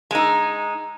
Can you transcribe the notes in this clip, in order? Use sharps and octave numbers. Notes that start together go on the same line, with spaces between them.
G#3 D#4